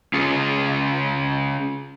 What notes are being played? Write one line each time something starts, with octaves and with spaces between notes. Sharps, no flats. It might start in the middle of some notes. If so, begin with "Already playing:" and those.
C#4 F4 G#4